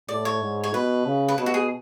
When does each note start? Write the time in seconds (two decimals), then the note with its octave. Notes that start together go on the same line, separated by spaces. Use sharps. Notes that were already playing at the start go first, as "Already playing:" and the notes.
0.09 A2 D5
0.25 C#5
0.42 G#2
0.64 C#5
0.73 B2 B4
1.05 C#3
1.28 B4
1.38 B2 A4
1.46 F#4
1.54 G#4